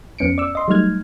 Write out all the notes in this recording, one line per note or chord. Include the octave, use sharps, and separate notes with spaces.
F2 B3 C#4 C#7 D7
D5 E6
D#5 C6
F#3 G3 A3 D#4 F6 G#6